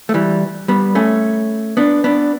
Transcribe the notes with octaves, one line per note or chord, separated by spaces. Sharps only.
A3
E3 G3
G3 B3
A3 C#4
B3 D4
B3 D4